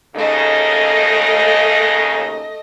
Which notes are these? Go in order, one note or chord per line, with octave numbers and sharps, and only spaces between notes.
D#2 C#3 A3 D#4 D#5